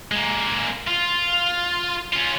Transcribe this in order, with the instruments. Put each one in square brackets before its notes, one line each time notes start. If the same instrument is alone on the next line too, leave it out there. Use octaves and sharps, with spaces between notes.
[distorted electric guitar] G#3 A#3
F4
C#4 F4